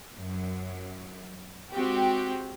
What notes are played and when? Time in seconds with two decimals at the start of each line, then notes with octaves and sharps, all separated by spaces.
0.16 F#2 F#3
1.73 G#3 C4 F#4 G4 G5